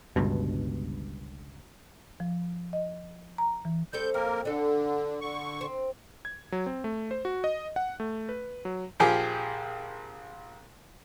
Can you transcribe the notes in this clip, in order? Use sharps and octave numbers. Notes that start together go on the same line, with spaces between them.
G1 C#2 G2 B2
F3
D#5
A#5
E3
G3 C4 A4 G6
F2 A#3 A#4
D3 D4 A4
D3 C#6
C4
G#6
F#3
C4
A3
C5
F#4
D#5
F#5
A3
B4
F#3
A#1 F3 G4 G#4 G5 G#5